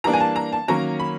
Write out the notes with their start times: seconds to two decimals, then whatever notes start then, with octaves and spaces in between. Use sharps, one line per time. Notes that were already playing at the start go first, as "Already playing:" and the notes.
0.04 E3 G3 A#3 D4 A#5
0.13 G#5
0.20 A5
0.36 A#5
0.52 A5
0.68 D#3 F#3 A#3 C#4 A#5
1.00 B5